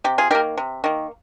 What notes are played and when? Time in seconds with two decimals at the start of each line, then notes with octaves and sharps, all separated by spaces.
0.04 C3 G4
0.18 F4 G#4
0.31 D#3 G4 A#4
0.35 A#3
0.57 C3
0.84 D#3 A#3